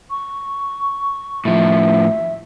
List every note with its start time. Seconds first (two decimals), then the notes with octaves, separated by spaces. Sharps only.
0.10 C#6
1.45 A2 F3 E5